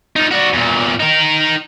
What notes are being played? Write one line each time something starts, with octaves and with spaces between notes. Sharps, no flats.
D#4 F4
F#4 D5
E2 A#2
D#4 A#4